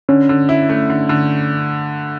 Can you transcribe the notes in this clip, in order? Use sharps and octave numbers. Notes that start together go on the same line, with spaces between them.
D3 C#4
D3
E4
A3
D3
D3